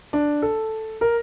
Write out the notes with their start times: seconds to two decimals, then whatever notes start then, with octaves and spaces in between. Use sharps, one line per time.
0.13 D4
0.42 A4
1.01 A#4